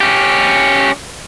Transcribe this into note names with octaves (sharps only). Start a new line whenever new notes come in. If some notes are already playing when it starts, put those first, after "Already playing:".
C#4 G4